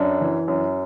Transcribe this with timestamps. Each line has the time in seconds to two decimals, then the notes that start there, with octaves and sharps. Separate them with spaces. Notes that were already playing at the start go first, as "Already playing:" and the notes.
Already playing: F#2 D4
0.21 E3
0.48 F#2